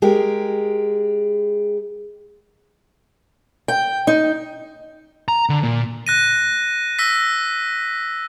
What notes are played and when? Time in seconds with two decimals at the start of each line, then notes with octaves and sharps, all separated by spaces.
0.02 G#3 G4 G#4 A#4
3.68 G5
4.07 D#4
5.28 A#5
5.49 D3
5.63 A#2
6.07 F#6 A#6 D#7
6.99 E6 A#6 B6